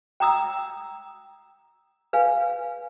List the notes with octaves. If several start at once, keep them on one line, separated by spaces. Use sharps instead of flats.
G5 A#5 D#6 E6
B4 F5 G#5